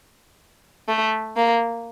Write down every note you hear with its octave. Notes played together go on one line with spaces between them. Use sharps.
A3
A#3